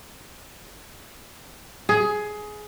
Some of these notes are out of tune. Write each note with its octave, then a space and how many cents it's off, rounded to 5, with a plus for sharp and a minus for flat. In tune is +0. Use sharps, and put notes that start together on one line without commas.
G#4 +15